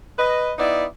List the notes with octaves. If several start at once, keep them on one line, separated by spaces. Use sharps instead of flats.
B4 D#5
B3 D#4 E4 D5